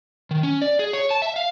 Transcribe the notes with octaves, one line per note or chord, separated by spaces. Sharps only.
D#3
C#4
D5
G#4
C#5
A5
E5
F5